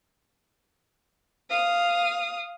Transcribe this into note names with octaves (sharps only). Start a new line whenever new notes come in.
F5 D#6